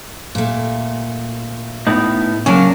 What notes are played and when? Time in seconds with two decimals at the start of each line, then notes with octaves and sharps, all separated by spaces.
0.35 A#2 A3
1.87 A2 B3 D#4
2.46 C#3 F#3 A#3 C#4 D4 A#4